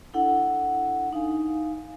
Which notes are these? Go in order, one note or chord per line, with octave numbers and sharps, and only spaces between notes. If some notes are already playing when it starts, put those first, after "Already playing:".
D4 E4 A4 F#5
D#4 F5 G#5